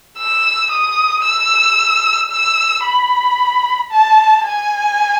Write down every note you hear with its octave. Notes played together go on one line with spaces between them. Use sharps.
E6
D#6
E6
E6
B5
A5
G#5